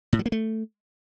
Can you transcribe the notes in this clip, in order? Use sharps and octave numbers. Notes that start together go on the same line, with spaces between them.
A2
F#3
A#3
A3